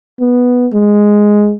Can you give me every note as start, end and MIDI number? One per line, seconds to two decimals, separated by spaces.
0.20 0.68 59
0.74 1.55 56